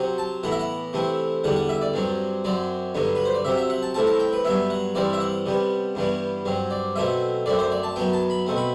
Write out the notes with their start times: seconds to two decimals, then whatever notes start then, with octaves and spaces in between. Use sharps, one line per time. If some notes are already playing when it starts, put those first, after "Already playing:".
Already playing: C3 F#3 C4
0.18 A5
0.43 A2 E3 B3 F#5
0.52 E5
0.59 F#5
0.93 C3 E3 A3 C4
1.44 E2 D3 G3 F#5
1.56 F#5
1.69 E5
1.81 D5
1.94 G2 F#3 C4
2.44 F#2 F#3 C4 D5
2.95 G2 D3 F#3 B3
3.15 B4
3.25 C5
3.34 D5
3.45 C3 F#3 C4 E5
3.57 E5
3.70 F#5
3.83 A5
3.94 A2 E3 A3 C4 A5
4.07 A5
4.20 G5
4.33 B4
4.45 G2 F#3 B3 E5
4.70 F#5
4.95 G2 E3 G3 C4 D5
5.13 E5
5.20 F#5
5.46 C3 G3 B3
5.95 G2 E3 G3 B3
6.46 G2 F#3 C4
6.71 D5
6.96 B2 F#3 A3 C4 E5
7.46 F#2 F#3 A3 C4 D5
7.59 C5
7.72 D5
7.83 A5
7.96 F#2 F#3 B3 G5
8.13 A5
8.30 B5
8.46 B2 A3 C4
8.56 B5